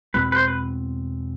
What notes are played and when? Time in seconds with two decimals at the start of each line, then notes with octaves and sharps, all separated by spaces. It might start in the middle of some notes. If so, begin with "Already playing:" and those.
0.14 E2 B2 G#3 C4 B4
0.32 B4
0.36 C5
0.48 B4